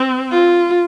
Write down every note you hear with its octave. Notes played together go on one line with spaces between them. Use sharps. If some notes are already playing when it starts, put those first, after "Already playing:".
Already playing: C4
F4